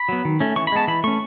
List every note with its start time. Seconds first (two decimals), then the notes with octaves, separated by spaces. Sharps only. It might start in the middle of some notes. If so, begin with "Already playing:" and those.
Already playing: B5
0.09 F#3 B3
0.25 D#3
0.40 A3 C#4
0.56 E3 C#6
0.67 B5
0.72 G#3 B3 A5
0.88 E3 B5
1.04 A3 C#4 C#6